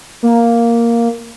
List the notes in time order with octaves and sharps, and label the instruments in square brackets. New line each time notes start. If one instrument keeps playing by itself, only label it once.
[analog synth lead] A#3